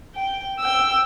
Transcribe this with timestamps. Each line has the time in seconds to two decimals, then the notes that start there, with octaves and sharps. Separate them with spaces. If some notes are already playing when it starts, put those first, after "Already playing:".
0.15 G5
0.60 G5 E6